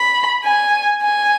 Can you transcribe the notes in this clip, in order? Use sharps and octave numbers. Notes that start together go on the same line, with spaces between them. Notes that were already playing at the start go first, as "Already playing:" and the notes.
Already playing: B5
G#5
G#5